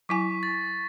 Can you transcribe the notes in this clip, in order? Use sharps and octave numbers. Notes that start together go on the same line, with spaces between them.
F#3 E4 G#5 C#6 B6
A6